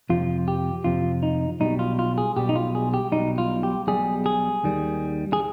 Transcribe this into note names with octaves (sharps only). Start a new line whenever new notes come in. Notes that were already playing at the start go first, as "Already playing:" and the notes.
F2 C3 F3 F4
G4
F2 C3 F3 F4
D#4
B1 B2 G3 D#4
F4
F4
G#4
B1 B2 G3 G4
D#4
F4
G#4
G4
B1 B2 G3 D#4
F4
G4
B1 B2 G3 G#4
G#4
D#2 D#3 G3
G#4